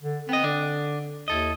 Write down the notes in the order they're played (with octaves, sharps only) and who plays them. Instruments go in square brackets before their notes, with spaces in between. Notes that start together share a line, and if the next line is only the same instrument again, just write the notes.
[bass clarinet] D3
[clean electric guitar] B3 D#5 [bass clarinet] C4
[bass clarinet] D3 [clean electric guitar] D4
[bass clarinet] D#2 [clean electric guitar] E4 A4 D#5